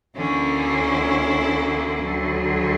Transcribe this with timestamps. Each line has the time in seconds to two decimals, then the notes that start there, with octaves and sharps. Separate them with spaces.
0.17 D2 D3 A#3 C#4 E4
2.02 D2 D3 F#3